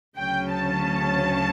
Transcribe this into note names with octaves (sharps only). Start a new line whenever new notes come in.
D2 C#3 F#3 C#4 G5
A5